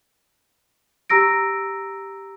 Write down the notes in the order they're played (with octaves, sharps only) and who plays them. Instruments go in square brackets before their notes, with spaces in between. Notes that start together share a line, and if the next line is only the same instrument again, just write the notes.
[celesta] G4 A#5 E6 A#6 D7